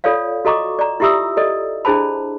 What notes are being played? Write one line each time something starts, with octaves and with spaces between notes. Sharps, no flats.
F4 A4 C#5 D5 F5
F#4 A4 D#5 A#5 C#6 D6
D5 A#5
E4 F4 G4 E5 D#6 E6
A4 D5 D#5
D4 E4 G#4 C5 A5 B5